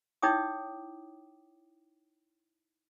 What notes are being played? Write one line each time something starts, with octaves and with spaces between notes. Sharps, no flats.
D#4 E4 C#5 G5 D6 D#6